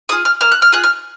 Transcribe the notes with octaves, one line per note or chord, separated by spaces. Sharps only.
F4 G#4 D#6
F6
A#3 F6
F#6
F6
F4 G#4 F#6
F6